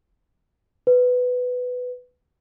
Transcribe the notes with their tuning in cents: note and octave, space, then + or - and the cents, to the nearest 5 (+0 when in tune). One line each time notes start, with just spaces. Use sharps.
B4 +10